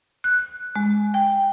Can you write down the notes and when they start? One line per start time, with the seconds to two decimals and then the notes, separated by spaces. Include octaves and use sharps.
0.24 F#6
0.76 G#3
1.14 G5